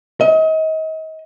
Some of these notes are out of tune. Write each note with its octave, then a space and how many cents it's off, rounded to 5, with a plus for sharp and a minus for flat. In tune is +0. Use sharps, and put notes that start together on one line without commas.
D#5 +35